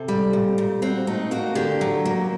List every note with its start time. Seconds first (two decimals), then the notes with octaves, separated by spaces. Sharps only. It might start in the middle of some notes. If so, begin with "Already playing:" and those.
Already playing: C3 A4
0.08 G3
0.33 A#2
0.58 A#2
0.82 C4 F#4
1.07 A3 D#4
1.31 A#3 F#4
1.55 D3 G4
1.81 F#3
2.05 A#3